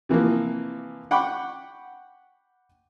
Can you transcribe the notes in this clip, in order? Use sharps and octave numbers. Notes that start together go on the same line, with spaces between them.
C3 E3 F3 A#3
F#5 G5 B5 C#6 D6